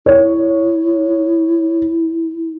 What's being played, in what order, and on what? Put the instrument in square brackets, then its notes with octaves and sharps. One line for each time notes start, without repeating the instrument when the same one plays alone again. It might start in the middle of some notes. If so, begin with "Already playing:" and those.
[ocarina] E4 [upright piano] C#5